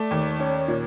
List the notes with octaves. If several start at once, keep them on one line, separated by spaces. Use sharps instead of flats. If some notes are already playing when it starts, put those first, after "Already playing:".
Already playing: A3 D5
D#2
C#4
A#2